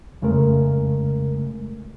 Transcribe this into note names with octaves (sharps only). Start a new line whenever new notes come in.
F2 C#3 G#3 A3 A#4